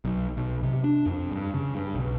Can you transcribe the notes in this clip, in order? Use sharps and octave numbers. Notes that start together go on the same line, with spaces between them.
B1
B1
C3
D4
F2
G2
C#3
G2
B1